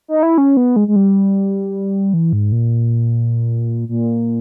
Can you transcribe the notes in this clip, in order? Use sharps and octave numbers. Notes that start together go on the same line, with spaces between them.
D#4
E4
C#4
B3
G#3
G#3
G3
E3
G#2
A#2
A#2